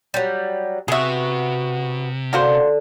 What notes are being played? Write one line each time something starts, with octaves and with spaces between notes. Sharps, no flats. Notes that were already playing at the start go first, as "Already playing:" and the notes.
F#3 G3
C3 B3 F#4 G#4 E5
D3 A#3 F#4 C5